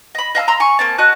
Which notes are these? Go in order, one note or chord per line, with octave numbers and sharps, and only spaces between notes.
D#5 B5
D#5 F5 A5 E6
A#5 C6 E6
G#5 C#6
A#3 C4 A5
F#4 D#5 A5 F#6